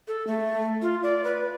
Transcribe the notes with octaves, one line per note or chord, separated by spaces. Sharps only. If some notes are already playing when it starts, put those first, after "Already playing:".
A4
A3
F4
D5
B4